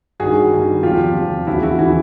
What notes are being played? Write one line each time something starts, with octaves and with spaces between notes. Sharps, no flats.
G2 D#3 G3 F#4 G#4
G2 D#3 G3
E2 C3 F3 F4 G4
E2 C3 F3
D#2 C#3 E3 E4 F#4
E4 F#4
C#3 E3 E4 F#4